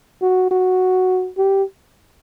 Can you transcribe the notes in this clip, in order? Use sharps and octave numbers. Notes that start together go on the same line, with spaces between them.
F#4
F#4
G4